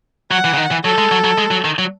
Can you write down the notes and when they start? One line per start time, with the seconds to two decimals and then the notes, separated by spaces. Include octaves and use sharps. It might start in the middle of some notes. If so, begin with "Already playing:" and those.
0.31 F#3 F#5
0.44 E3
0.54 C#3
0.57 D#3
0.71 E3
0.84 F#3 A4
0.98 G#3
1.11 F#3
1.24 F#3
1.38 G#3
1.51 F#3
1.64 D#3
1.79 F#3